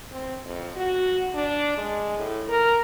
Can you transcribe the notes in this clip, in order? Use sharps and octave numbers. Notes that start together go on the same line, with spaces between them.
C4
F2
F#4
D4
G#3
A2
A#4